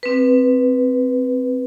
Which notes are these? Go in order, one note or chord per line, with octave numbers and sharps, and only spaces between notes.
C4 B4